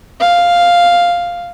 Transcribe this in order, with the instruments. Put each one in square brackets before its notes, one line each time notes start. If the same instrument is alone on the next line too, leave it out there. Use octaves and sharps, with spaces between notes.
[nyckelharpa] F5